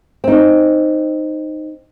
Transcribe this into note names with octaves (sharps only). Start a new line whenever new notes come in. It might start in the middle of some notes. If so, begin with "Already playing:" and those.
C4 D#4